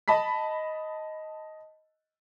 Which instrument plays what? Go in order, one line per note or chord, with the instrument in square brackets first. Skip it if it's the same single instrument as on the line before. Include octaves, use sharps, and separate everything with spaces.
[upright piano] D#5 A5 B5 B6